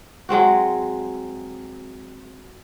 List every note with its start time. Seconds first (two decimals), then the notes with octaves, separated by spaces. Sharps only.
0.29 F#3 G#3 C4 F#4